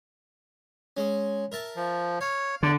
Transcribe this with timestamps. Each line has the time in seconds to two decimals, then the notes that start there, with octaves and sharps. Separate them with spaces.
0.97 G#3 C#4
1.52 A#4 E5 A5
1.76 F3
2.21 C#5 F5
2.63 E2 D3 D5